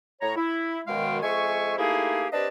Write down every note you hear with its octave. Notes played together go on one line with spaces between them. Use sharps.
A2 C#5 A#5
E4
F#2 B2 D#3 G#3 F5 G5
F2 G#3 E5 G#5 C#6
A3 A#3 D#4 E4 G4 G#4
C4 D4 G4 B4 D#5 A5